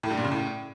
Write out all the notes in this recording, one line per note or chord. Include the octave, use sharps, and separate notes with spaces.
A2
G2
A#2
C#3
A2